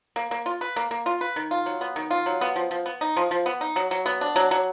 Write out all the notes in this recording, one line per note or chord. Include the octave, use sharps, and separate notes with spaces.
A#3
A#3
F4
B4
A#3
A#3
F4
B4
D#3
F4
F#3
B3
D#3
F4
F#3
B3
F3
F3
B3
D#4
F3
F3
B3
D#4
F#3
F#3
B3
D4
F#3
F#3